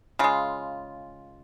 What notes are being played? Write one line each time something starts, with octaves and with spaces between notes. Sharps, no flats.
C#3 G#3 F4